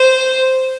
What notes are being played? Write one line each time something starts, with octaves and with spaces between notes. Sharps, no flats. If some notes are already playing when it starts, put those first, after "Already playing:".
Already playing: C5